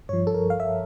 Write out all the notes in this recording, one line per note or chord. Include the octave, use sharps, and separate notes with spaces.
G2 F3 C#5
A4
A#4
F5
E5